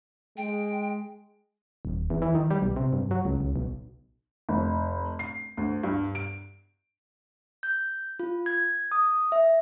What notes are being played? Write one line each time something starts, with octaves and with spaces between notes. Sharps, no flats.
G#3 G5
D#1
E2
E3
D#3
G3
B1
C3
G2
F#3
C#2
C#2
B1
F1
C7
D2
G2
D7
G6
F4
G#6
D#6
E5